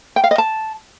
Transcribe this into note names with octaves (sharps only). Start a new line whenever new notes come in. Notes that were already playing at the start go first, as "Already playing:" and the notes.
G5
F5
D#5
A5